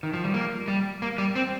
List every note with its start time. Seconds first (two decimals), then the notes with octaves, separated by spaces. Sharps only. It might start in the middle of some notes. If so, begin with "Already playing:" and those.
0.03 D#3
0.14 F3
0.24 G3
0.34 A#3
0.68 G3
1.02 A#3
1.18 G3
1.36 C4